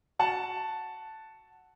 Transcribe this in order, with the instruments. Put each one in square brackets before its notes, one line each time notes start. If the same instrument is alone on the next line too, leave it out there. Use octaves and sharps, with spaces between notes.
[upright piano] F#4 F#5 A5